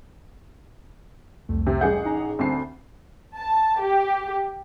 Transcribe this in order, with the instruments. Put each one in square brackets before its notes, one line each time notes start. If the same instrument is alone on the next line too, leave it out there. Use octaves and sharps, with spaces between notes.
[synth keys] C2 F2 A3
[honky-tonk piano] C3
[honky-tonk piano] A1 G#4 F#5 [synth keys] G6
[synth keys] D#4 A#5
[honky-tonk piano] D2 C7 [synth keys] C4 A5
[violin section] A5
G4